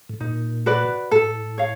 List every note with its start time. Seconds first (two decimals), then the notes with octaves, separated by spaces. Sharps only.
0.09 A2
0.20 A#2 D#4
0.66 F#4 B4 D5
1.11 A2 A4
1.58 C#5 F5